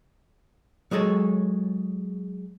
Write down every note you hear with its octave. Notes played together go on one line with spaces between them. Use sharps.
F#3 G#3 G#4 A4 C#5